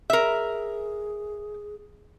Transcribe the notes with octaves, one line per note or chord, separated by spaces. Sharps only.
G#4 A#4 E5